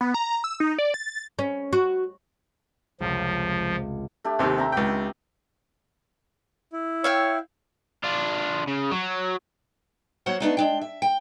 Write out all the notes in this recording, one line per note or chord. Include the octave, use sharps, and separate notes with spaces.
B3
A#5
E6
D#4
D5
A6
C#4
F#4
F1 C#2 F3
A3 D4 G4
D#2 C3 D#3 E5
C4 D4 A#5
C#2 G5
E4
C#5 E5 F5 G5
D4 F4
C#3
F#3
F#3 A#3 F#4 C5 C#5 F#5
A3 B3 D4 D#4
G#3 D4 G5
E5
G5